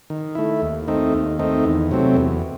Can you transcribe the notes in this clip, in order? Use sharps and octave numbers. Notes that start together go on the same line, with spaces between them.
D#3
A3 E4
D#2
D#3 A3 C4 D#4
D#2
D#3 A3 C4 D#4
E2
C3 F#3 A3 C4
E2